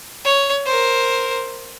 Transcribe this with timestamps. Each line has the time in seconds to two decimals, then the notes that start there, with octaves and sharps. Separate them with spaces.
0.25 C#5
0.66 A#4 C5